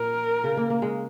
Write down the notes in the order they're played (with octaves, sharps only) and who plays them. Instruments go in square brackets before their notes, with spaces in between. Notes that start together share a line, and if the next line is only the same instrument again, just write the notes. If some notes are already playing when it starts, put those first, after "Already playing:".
Already playing: [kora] A#2 [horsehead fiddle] A#4
[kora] C#3
A#3
A#3
G#3